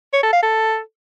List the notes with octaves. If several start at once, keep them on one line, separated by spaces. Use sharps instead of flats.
C#5
A4
F5
A4